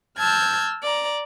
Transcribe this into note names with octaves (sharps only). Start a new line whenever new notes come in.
A5 E6 F6 G6 G#6
D5 A#5